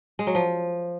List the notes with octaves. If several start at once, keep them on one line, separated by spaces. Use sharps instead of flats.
G#3
F#3
F3